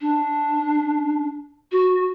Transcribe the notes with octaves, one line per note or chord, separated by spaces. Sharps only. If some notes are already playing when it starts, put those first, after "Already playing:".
D4
F#4